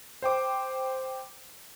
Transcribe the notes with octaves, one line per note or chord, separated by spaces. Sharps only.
C5 G5 D6